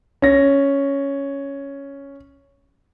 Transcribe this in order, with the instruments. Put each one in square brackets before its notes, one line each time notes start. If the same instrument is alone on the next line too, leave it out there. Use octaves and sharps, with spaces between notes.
[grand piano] C#4 A#6